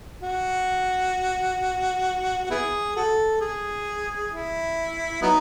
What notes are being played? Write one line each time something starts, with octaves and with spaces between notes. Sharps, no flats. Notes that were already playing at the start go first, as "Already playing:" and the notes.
F#4
F#4
B3 E4 G#4
F#4 A4
G#4
E4
F#3 B3 D#4